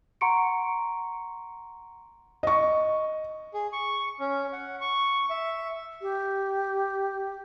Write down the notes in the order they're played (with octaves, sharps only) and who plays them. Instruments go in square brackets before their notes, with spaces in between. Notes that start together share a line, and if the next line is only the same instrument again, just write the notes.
[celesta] F#5 A#5 C6 C#6 C#7 D7
[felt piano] D#5 C#6
[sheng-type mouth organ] G#4
C#6
C#4
F#5
C#6
E5
[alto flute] G4